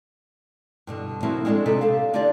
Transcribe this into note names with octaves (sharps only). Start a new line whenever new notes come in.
G2 B2 D3
F3 F#3 A#3 C4 E4 F#4
G#3 C4 D4 F4 A4
C3 D#4 A4 B4
G4 A4 F5
D3 D4 D#4 F4 G4 D5